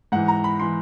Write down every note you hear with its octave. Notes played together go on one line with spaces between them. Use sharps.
G#2 E3 F#5
A#5
B5
E3 C6